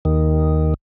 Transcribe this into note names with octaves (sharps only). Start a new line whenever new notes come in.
D#2 D#3